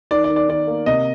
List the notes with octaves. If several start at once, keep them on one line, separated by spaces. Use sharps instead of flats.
D#3 D5
D5
D#3
D5
D#3 D5
A#3
C3 D#5